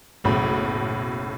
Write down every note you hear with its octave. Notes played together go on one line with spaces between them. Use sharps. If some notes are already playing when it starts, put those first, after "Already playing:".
F#1 B1 A2 B5